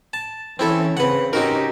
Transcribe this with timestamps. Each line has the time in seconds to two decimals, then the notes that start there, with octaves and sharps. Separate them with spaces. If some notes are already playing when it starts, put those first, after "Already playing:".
0.13 A5
0.59 E3 C4 C#4 E4 A4
0.97 C#3 C4 B4 F#5
1.33 C4 C#4 D#4 F#4 G4 A#4